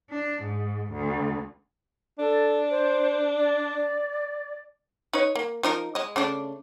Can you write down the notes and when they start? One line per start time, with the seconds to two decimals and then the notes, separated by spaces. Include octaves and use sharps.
0.10 D4
0.43 G#2
0.93 D2
2.19 D4 A4
2.70 C5
3.37 D5
5.13 D#4 B4 C#5
5.35 A#3
5.63 F3 D#4 A#4
5.95 G#3 D#5
6.16 C#3 A3 D4